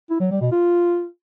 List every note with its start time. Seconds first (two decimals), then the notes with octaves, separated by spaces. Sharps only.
0.10 E4
0.20 F#3
0.31 G3
0.41 B2
0.52 F4